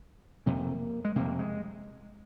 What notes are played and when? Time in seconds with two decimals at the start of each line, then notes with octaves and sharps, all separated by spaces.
0.46 F2 C3 A#3
1.05 G#3
1.16 F2 C3 A#3
1.39 G#3